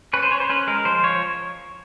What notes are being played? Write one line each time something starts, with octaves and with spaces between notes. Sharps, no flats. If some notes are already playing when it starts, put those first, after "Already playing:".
C#4 B4
C5
C#4 C#5
C5
C#4 B4
G#3 A#4
F3 C5
F3 C#5